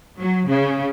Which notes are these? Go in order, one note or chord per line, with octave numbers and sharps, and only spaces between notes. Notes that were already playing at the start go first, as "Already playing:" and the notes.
F#3
C#3